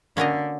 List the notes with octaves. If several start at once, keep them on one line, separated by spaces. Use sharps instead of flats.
D3 A#3 C#4 F#4 A#4 D#5